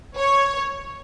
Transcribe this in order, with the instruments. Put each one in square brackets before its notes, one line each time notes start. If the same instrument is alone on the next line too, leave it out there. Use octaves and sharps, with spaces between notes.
[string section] C#5